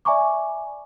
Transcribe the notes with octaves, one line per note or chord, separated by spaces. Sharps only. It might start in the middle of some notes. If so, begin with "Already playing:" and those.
D5 E5 G#5 A#5 C#6 D6